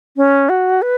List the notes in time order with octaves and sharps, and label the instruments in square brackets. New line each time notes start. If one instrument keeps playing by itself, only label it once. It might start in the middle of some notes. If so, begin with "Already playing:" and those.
[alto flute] C#4
F#4
B4